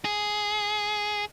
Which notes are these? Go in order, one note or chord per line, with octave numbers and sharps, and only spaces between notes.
G#4